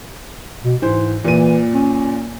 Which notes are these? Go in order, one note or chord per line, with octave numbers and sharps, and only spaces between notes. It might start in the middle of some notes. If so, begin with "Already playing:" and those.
B2
G#2 E3 C5
A#2 E3 D#7
C#4